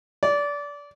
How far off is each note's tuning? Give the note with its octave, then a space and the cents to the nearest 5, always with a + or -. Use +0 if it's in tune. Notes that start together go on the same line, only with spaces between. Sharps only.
D5 -25